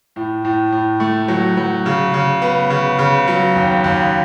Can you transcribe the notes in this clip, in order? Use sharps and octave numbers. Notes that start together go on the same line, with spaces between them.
A2
A2
A2
A3
F#3
F#3
C#3
C#3
B3
C#3
C#3
F#3
D#2
D#2